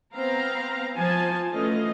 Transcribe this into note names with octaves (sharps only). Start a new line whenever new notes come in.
B3 C4 F5 A#5
F3 F4 G#5 A5
E3 A3 C#4 F4 D#5 F5